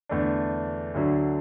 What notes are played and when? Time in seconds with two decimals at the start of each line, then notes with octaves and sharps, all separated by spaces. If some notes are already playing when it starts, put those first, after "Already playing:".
0.09 E2 D3 A3 D4
0.95 D2 D3 F#3 D4